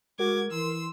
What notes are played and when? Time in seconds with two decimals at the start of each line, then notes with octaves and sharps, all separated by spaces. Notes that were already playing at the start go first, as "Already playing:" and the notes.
0.19 G#3 F#4 A#4 D6 G#6
0.51 E3 C6 E6